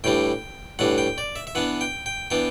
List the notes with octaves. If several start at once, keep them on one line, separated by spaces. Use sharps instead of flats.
A2 E3 G3 D4 G5
A2 E3 G3 D4 F#5
G5
D5
E5
E5
E3 B3 D4 F#5
G5
G5
E3 B3 D4 G5